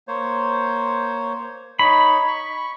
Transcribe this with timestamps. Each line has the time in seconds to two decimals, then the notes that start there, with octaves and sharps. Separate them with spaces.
0.08 A#3 C5 C#5
1.79 D#4 C#5 B5
2.28 C#6